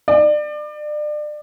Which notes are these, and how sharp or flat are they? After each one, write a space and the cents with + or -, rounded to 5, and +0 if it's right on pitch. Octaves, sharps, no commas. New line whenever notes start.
D5 +30